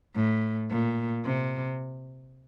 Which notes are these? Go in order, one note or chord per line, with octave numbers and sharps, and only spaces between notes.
A2
A#2
C3